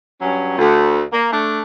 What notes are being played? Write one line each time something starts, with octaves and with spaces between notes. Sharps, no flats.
G2 F#3 C#4
D2
A#3
A3 D4